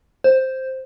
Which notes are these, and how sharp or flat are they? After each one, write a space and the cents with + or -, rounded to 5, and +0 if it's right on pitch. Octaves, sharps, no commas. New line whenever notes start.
C5 +5